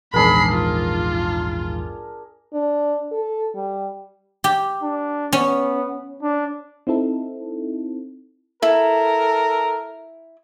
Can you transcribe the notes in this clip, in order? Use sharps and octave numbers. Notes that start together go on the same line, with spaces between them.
A#1 E2 G#2 D4 G#4 A#4 B5 C7
F4
D4
A4
G3
G4
D4
B3 C#4
D4
C4 D#4 E4 A4
E4 A4 A#4